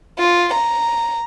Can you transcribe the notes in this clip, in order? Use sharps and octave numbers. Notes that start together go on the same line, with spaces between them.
F4
A#5